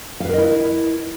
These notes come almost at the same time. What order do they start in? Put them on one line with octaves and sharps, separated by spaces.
F5 B4 A#4 D#5 E4